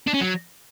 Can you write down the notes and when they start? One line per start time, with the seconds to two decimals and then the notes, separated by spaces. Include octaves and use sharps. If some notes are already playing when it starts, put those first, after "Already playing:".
0.07 D4
0.14 C#4
0.20 F#3